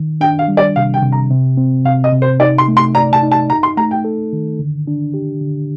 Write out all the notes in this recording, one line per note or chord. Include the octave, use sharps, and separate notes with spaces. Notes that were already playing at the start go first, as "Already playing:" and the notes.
Already playing: D#3
D4 G5
F5
G3
D5
C3 F5
G5
C3
A#5
C3
C4
C3 F5
D#5
C3
C5
D#4 D5
C6
A3
C6
D5 A#5
A5
D#4
A5
D#4 A#5
C6
A3 A#5
G5
A4
D#3
D3
D4
G4
D3